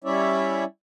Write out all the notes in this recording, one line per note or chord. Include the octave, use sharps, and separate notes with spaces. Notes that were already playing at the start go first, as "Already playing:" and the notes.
G3 C#4 E4 C#5 D5 E5